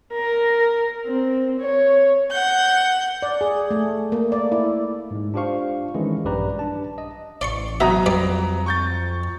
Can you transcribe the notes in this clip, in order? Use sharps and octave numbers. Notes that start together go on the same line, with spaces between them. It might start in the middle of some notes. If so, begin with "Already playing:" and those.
A#4
C4
C#5
F#5 G6
D5
G#4
A3
A#3
D5
E4
G#2 G#3
D4 F4 G4 C5 F5 C#6
D#3 E3 G#3 C#4 E4
A#1 G2 G4 B4 D5 A#5
D4 A5
D#5
A1 D5 C6 C#6
B2 F#3 E5 A#5 D#6
F2 G3 B4 D5
C#6 G6 A6